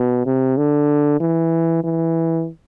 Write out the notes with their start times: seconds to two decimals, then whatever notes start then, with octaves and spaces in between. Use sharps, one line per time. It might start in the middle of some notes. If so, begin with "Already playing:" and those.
Already playing: B2
0.26 C3
0.57 D3
1.20 E3
1.84 E3